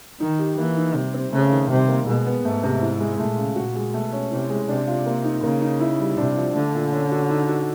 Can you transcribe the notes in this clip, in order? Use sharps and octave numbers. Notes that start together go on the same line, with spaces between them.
D#3 D#4
G4
E3 A#3
D#4
C3 G3
C4
C#3 A3
D#3
C3 G3
A#3
B2 G#3
B3
G#2 A3
C3
E4
G#3
A#2 A3
C#3
A#2 F#4
G#3
B2 A3
C#4
C3 E4
G#3
C3 D4
F4
A#3
D#4
C#3 A#3
D#4
E4
G3
C3 D4
F3
D3 A3
A#2
C#4
F#4
D#4
F#4